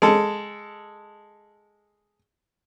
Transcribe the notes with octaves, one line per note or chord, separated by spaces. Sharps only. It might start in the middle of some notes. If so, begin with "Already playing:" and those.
G#3 A4